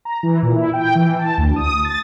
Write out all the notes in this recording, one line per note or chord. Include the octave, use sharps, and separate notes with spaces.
A#5
E3
A#2
E4
G5
E3
A5
D2
D#6
A6